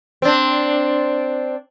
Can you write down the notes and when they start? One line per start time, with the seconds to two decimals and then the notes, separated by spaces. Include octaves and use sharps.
0.22 C4 D4